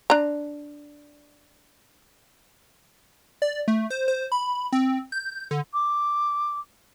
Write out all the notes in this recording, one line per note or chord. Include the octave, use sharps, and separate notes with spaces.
D4 A#5
D5
A3
C5
C5
B5
C4
G6
D3
D6